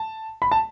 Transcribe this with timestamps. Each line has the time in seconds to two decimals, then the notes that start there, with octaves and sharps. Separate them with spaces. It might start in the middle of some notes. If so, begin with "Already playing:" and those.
Already playing: A5
0.42 B5
0.52 A5